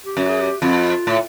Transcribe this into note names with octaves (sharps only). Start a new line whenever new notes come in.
G4
F#2 F#4
G#4
G4
F2 F4
A2